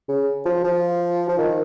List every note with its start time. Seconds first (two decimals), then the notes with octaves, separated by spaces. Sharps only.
0.08 C#3
0.45 F3
0.64 F3
1.29 F3
1.38 D#3